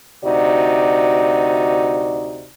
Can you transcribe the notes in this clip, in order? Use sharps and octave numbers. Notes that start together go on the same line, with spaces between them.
D2 C3 D#4 F#4 D5